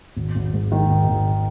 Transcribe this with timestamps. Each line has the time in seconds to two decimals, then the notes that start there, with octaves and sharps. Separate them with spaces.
0.16 G#1
0.35 G#1
0.53 G#2
0.72 D#3
0.90 G#1
1.08 G#1